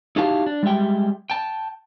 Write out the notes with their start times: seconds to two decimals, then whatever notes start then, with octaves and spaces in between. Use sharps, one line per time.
0.16 D#4 E4 F#4 G4 F5 A5
0.46 D4
0.63 G3 G#3 G4 E5 G5
1.30 G5 A5